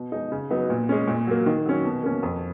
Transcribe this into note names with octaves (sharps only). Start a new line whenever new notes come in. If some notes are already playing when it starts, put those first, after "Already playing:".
Already playing: B2
G#3 D#4
C#3
F#3 B3 D#4
A#2
G#3 C#4
A#2
F#3 A#3
D#3
F#3 C#4
B2
A#3 C#4
F2